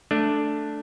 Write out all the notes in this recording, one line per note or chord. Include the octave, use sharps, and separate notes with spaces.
A3 D4